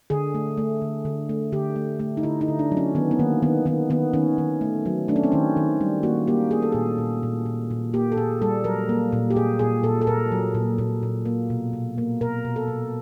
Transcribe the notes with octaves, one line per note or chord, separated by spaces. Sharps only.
D3 G#4
A3
A3
D3
D3
A3
D3 G4
A3
A3
D#4
D3 E4
D#4
D3
D4
F#3
C#4
D#3 B3
B3
D#3 A#3
D#3 B3
D#3 B3
D#3 B3
D#3 C#4
D#3
A3
F#3
A3 D4
C#4
C4
D#3 C#4
D#3
G3
A#3 F#4
A#3 G4
A#3 G#4
A4
A#2 G#4
A#2
A#2
A#2
A#2
A#3 G4
A4
A#2 G#4
G3 A4
F#3 A#4
A#3
A#2
G4
A#2 G#4
A#2 G#4
A#2 A4
A4
A#2 A#4
F#3
A#2
A#2
A#2
A#3
B2
B2
A#3
B2 A#4
B2
A4
B2